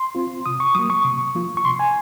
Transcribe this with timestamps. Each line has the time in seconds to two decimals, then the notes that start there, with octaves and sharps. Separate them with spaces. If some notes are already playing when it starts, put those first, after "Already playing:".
Already playing: C6
0.15 C4 F4
0.46 C3 D#6
0.60 C#6
0.75 F#3 A#3 D#6
0.90 C#6
1.05 C3
1.35 F3 A#3 F4
1.57 C#6
1.65 C3 C6
1.79 G#5